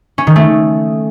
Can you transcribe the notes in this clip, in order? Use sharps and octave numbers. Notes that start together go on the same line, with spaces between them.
C#4
D#3
A3